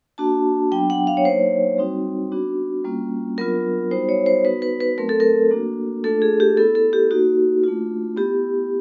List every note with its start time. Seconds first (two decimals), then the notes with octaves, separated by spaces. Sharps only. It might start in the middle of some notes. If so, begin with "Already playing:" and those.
0.18 A#3 D4 F#4 A5
0.71 F#3 B3 D4 G5
0.90 F#5
1.07 F5
1.17 C#5
1.25 F#3 A#3 D#4 C5
1.78 G3 C4 D#4 F#4
2.32 B3 D4 F#4
2.84 G3 A#3 C#4 F4
3.38 F#3 B3 D4 F4 A#4
3.91 G3 B3 D#4 F#4 C5
4.09 C#5
4.26 C5
4.44 B3 D#4 F#4 B4
4.62 B4
4.80 B4
4.98 F#3 A3 C4 A#4
5.09 A4
5.20 A#4
5.51 A#3 D4 F#4
6.04 A3 D4 F4 A4
6.22 G#4
6.40 G4
6.57 B3 E4 A4
6.75 A4
6.93 G4
7.11 A#3 D#4 F#4
7.64 A3 D4 F4
8.17 B3 E4 G4